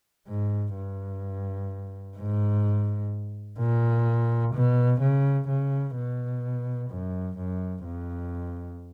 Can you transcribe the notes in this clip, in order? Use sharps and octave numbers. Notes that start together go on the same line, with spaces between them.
G#2
G2
G#2
A#2
B2
C#3
C#3
B2
F#2
F#2
F2